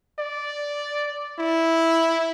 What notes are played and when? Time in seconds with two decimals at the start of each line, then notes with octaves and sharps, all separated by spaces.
0.19 D5
1.39 E4